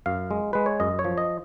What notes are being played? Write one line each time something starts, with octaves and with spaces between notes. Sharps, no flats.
F#2 F5
G#3
G#3 B4
C#5
F#2 D#5
C#5
F3
D#5